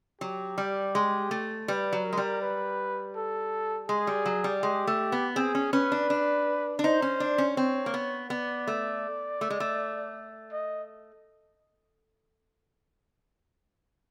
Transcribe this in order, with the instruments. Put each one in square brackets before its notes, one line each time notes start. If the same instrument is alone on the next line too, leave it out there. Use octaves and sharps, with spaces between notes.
[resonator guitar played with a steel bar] F#3 [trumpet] G4
[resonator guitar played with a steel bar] G3
G#3
A3
[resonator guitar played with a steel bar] G3 [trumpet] B4
[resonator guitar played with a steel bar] F#3
[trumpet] A#4
[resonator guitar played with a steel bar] G#3
G3
[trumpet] B4
A4
[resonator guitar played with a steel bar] G#3 [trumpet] G#4
[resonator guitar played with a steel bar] G3
F#3
G3
[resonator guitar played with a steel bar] G#3 [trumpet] G4
[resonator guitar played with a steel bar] A3
B3
[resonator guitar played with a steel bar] C4 [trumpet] G#4
[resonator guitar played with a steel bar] C#4
[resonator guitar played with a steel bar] C#4 [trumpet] B4
[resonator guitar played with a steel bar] D4
D4
D4
[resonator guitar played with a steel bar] D#4 [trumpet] C5
[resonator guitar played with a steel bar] C#4
D4
C#4
[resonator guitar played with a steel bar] C4 [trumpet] C#5
[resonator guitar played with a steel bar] A#3
B3
[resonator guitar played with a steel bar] B3 [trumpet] D5
[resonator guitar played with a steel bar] A3
A3
G#3
A3
[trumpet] D#5